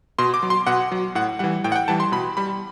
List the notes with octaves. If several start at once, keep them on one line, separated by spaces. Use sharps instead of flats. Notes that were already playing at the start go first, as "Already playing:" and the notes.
B2 C6
D6
F#3
C6
B2 F#5
F#3
A2 F#5
E3 G3 F#5
A2 G5
F#5
G5
E3 G3 A5
C6
B2 B5
G3 B5